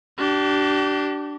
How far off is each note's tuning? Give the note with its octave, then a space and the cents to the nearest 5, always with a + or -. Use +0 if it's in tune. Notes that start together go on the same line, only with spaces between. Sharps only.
D4 +0 G4 -40